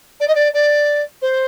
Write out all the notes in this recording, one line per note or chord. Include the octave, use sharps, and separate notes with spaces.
D5
D#5
D5
D5
C5